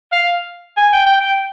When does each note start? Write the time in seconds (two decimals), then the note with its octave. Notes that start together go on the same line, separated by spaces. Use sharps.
0.12 F5
0.77 G#5
0.93 G5
1.06 G5
1.21 G5